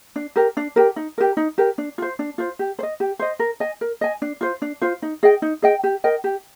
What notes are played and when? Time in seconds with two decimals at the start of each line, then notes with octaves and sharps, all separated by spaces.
0.16 D4
0.36 G4 A#4
0.57 D4
0.76 G4 A#4
0.96 D#4
1.18 G4 A#4
1.37 D#4
1.58 G4 A#4
1.78 D4
1.98 F4 C5
2.19 D4
2.38 F4 C5
2.59 G4
2.79 C5
2.83 D#5
3.00 G4
3.19 C5 D#5
3.39 A#4
3.60 D#5 G#5
3.81 A#4
4.01 D#5 G#5
4.22 D4
4.41 F4 C5
4.62 D4
4.82 F4 C5
5.02 D#4
5.23 G#4 D#5 G5
5.42 D#4
5.62 G#4 D#5 G5
5.84 G4
6.04 A#4 D#5 G5
6.24 G4